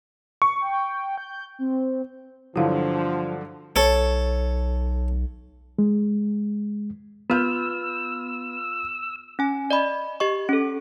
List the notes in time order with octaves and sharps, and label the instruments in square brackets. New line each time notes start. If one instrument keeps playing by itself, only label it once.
[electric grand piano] C#6
[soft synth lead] G5
G6
C4
[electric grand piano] G2 D3 F#3 [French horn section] F3 D4 [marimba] E4 F5
[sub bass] B1 [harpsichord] A4 C#5
[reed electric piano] G#3
[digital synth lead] B3 [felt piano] F4 F6 G6 [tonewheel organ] E6
[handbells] C#4 G#5
D5 D#5 B5
G4 D#5 C#6
C#4 A4